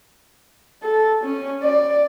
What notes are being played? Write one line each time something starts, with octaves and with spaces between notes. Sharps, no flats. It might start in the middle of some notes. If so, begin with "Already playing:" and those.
A4
C#4
D5